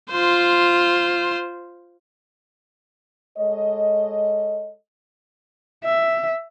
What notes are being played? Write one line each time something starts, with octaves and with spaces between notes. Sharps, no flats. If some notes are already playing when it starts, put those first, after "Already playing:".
F4 C5
G#3 A4 C#5 D#5
E5